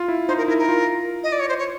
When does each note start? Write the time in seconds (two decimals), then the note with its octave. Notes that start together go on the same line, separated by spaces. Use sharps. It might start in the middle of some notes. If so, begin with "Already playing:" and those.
Already playing: F4
0.08 E4
0.28 D#4 C5
0.38 A#4
0.48 E4 A#4
0.59 A#4
0.69 F4
1.24 D#5
1.32 D5
1.40 C#5
1.49 C5
1.59 C#5